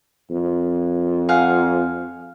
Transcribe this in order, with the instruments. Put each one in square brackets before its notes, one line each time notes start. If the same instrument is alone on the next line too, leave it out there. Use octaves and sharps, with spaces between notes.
[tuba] F2
[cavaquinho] G#4 F5 F#5